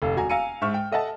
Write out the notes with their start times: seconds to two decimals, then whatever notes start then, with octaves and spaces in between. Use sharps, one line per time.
0.02 F1 A4 F5
0.16 E1 F#4 G#5 A#5
0.29 F5 G#5 A#5 E6 C#7 D#7
0.61 G#2 E5 C#6 F6
0.74 G5
0.92 A4 D#5 E5 F#5 A5